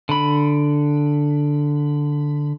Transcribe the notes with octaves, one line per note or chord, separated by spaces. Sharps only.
D3 B5